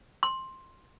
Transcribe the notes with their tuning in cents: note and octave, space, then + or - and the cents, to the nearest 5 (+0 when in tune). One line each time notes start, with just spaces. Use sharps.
C6 +10